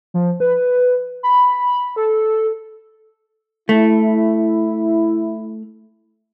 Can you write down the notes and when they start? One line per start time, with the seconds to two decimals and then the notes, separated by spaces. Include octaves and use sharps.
0.14 F3
0.40 B4
1.23 B5
1.96 A4
3.69 A3 E4